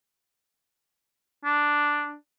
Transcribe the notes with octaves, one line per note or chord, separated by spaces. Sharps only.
D4